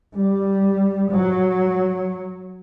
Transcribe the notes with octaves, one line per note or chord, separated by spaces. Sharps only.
G3
F#3